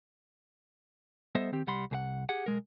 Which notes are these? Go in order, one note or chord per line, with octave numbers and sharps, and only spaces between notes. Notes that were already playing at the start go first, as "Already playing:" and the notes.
G3 B3 A4 C5 D#5 E5
D#3 C4 G4
C2 G3 F#5 B5 C6
C2 G#4 F#5
G4 G#4 F#5
B1 G#3 A#4